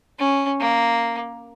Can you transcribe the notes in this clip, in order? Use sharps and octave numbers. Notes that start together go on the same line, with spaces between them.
C#4
A#3